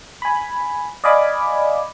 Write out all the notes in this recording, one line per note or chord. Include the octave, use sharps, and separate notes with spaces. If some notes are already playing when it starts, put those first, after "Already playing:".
G#5 B5
D5 D#5 F5 G#5 B5 D6